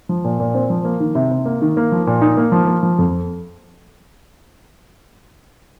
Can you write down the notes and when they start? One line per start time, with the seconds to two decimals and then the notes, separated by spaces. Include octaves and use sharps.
0.09 F3
0.24 A#2
0.40 A#2
0.54 C4
0.70 F3
0.85 A#3
1.00 D#3
1.15 C3
1.31 C3
1.46 A#3
1.62 D#3
1.77 A#3
1.92 F3
2.07 A#2
2.21 D#4
2.37 A#3
2.52 F3
2.67 A#3
2.83 F3
2.99 F2